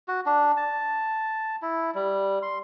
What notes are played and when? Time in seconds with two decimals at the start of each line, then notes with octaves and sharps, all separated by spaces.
0.08 F#4
0.26 D4
0.57 A5
1.62 E4
1.95 G3
2.42 C6